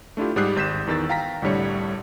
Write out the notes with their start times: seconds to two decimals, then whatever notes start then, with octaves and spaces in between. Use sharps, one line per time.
0.17 A3 D4 E4 F4 G4
0.36 G#2 G3 G4 D#6 F#6 C7
0.56 G#1 G6 B6 E7
0.87 E2 D#3 E6 A6
1.09 F5 G5 A#5 A#6 B6
1.42 C2 A2 D3 G3 C#5 C#7